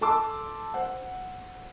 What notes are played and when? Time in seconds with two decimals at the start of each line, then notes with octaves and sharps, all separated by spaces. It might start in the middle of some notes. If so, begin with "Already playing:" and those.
0.01 A4 A5 C6 D6 E6
0.74 C5 F#5